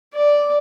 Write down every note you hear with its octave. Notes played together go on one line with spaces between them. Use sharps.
D5